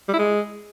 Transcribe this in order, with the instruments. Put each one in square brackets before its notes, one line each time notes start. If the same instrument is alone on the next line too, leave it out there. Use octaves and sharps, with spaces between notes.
[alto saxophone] G3
E4
G#3